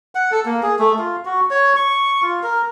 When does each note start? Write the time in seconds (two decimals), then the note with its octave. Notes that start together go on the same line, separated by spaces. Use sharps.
0.15 F#5
0.32 A4
0.45 A#3
0.63 G#4
0.79 A3
0.99 F4
1.25 F#4
1.50 C#5
1.77 C#6
2.23 F4
2.43 A#4